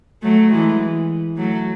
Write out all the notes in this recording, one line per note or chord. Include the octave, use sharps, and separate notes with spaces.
F#3 A3
E3 G#3
F#3 A3